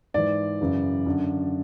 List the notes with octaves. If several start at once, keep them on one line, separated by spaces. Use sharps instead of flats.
G#2 E3 D5
F#2 C#3 E3
F#2 D3